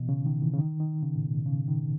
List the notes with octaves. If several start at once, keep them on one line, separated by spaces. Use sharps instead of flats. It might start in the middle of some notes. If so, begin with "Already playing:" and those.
Already playing: B2 E3
C#3
D#3
E3
C#3
D#3
D#3
C#3
A2
B2
C#3
D#3